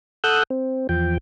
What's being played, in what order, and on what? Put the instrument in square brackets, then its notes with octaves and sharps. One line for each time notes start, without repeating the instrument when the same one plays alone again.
[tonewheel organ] A4 F#5 D#6 E6 F#6 G6
C4
E2 F3 G5